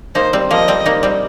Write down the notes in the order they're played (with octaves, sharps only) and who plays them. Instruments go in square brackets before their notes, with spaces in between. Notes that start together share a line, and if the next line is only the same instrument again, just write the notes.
[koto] A#3 D#4 [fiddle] C5
[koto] G3 C4
[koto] F3 A#3 [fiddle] D#5
[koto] G3 C4
A#3 D#4
G3 C4